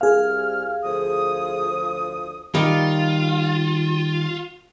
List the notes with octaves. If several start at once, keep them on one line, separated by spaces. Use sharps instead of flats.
C2 G#4 F5 F6
D2 F3 D#6
D#3 G3 F4